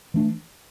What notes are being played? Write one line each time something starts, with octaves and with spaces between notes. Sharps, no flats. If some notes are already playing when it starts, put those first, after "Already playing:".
E3 A3 D4